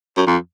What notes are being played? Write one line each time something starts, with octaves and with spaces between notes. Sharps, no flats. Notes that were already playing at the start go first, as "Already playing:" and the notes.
F#2
F2